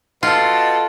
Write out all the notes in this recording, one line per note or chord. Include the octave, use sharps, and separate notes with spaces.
B2 F4 A4